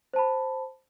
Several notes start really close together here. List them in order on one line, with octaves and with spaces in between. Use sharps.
C5 A5 B5